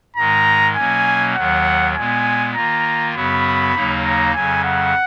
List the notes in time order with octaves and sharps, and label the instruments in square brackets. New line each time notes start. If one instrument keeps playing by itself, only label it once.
[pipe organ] G#2 D#3 G#3 [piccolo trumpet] A#5
[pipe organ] B2 F#3 A#3 C#4 [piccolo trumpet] G#5
[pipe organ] D#2 D#3 F#3 [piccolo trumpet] F#5
[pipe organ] A#2 G#3 B3 [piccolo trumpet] G#5
[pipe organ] D#3 A#3 F4 [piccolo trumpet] A#5
[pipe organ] F#2 C#3 F#3 B3 F#4 [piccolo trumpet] B5
[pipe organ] D#2 C#3 F#3 A#3 D#4
[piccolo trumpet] A#5
[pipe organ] F2 C#3 F#3 [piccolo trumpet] G#5
[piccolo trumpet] F#5